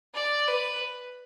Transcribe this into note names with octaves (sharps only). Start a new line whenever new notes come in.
D5
B4